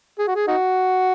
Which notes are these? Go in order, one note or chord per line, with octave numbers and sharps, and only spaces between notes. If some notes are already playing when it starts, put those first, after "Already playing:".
G#4
F#4
G#4
D#4 F#4